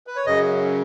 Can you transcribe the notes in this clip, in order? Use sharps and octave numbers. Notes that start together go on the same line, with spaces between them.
B4
C#5
F#2 C#3 D#5